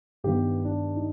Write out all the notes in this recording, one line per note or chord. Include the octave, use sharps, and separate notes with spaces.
G2 D#3 G3 B3 G4
D4
D#4